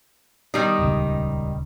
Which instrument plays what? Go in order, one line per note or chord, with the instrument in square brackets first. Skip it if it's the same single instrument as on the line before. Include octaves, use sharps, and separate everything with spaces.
[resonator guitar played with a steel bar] D#3 G3 D#4
[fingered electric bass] D#1 C#2